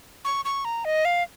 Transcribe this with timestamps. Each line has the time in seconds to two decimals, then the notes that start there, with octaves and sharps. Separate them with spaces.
0.25 C#6
0.45 C#6
0.65 A#5
0.85 D#5
1.05 F5